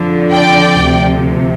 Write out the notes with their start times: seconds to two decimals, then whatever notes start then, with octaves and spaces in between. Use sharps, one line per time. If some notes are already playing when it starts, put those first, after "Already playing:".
Already playing: F2 D3 F3
0.31 D5 G5
0.80 D2 C3 F3